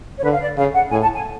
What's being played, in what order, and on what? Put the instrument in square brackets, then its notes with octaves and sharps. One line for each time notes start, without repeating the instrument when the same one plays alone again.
[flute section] C#5
[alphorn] D3 [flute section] B4
[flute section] F5
D5
[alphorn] C#3 [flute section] F5
[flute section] F#5
[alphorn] A2 [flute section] G#5
[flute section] A5
G#5